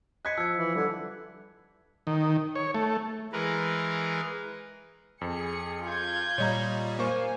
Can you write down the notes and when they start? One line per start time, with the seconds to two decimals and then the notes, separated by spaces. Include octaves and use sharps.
0.25 D#5 F#6 G#6 B6 C#7
0.37 F3 E6 G#6
0.56 E3
0.75 D3 G3
2.07 D#3
2.55 C#5
2.75 A3
3.33 E3 G#3 A#4 B4
5.21 F2 G#4 C#7
5.88 F4 G6 G#6
6.38 A#2 G3 C#5 D#5 A#5
6.99 A#3 C5 F5 G#5 C#6